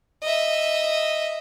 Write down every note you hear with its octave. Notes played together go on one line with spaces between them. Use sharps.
D#5 E5